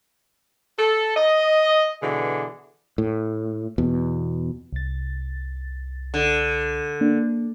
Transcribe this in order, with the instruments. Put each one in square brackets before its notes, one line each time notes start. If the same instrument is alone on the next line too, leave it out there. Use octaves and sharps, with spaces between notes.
[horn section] A4
D#5
B2 D3 E3 G#4
[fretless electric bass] A2
E2 B2
[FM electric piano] C2 A6
[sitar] D3
[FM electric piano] A#3 D4